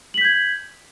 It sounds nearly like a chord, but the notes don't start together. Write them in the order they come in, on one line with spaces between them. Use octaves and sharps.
F#7 B6 G6 G#6